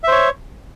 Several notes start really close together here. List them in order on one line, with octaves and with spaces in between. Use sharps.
E5 C5 C#5